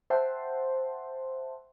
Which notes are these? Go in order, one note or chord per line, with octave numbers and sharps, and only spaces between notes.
C5 E5 F#5 G5 A5 C6